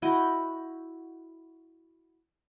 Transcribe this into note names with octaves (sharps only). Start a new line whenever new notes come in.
E4 F#4 D#5 G5